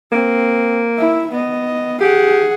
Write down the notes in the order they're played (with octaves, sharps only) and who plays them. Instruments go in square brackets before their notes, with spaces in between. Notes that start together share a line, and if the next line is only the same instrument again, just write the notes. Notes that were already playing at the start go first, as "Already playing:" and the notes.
[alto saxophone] A#3 [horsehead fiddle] C4
[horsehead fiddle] E4 E5
B3 D#5
[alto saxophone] G4 [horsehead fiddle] G#4 F#5